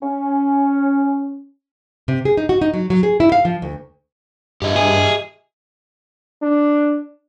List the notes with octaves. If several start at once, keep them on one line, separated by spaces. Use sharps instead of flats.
C#4
C3
G#4
D#4
F#4
D#4
F#3
F#3
G#4
E4
F5
F3
D2
G2 G4 D#5 E5
G#4
D4